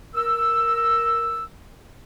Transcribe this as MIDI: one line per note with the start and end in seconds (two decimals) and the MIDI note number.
0.15 1.45 70
0.15 1.45 88